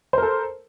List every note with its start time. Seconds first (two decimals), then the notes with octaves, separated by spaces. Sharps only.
0.13 C5
0.18 A#4
0.22 A4